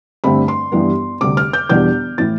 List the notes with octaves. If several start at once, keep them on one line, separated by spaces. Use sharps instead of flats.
G2 D3 A3 C4 B5
C6
G2 E3 G3 B3
D2 C3 G3 D6
F6
G6
E2 B2 G3 B3 D4 G6
A2 E3 A6